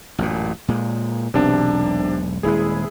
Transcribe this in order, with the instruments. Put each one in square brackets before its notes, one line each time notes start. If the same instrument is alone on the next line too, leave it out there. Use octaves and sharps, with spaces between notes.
[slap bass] A1 F#2 A#2
A#2 G#3
[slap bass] E1 B1 [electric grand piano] C3 D4
[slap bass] D#1 G#3 [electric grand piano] E4 G#4